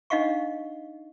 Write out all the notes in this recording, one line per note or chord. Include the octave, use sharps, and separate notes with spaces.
D4 D#4 D#5 F5 F#5 C#6